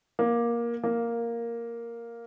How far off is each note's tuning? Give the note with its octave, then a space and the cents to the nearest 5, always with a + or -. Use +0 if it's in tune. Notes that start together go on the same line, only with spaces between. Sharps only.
A#3 +15
A#3 +0